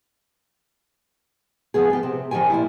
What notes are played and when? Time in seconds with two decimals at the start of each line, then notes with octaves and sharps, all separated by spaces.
1.74 F3 B3 G#4
1.90 B3 G4
2.03 C3
2.31 D#3 F3 G4 G5 G#5
2.50 A#2 G3 E4